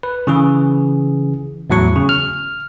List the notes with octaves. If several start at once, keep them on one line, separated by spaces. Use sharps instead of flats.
B4
C#3 E3 G#4
E2 A2 F#3 C#6
C#3
F6